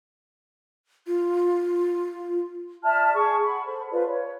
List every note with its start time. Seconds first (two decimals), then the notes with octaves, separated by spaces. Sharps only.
1.07 F4
2.84 D5 E5 A5 F6
3.13 G#4 C#6
3.45 F#5 B5
3.66 A4 C5 B5
3.91 F4 B4 C5 D5
4.06 C#5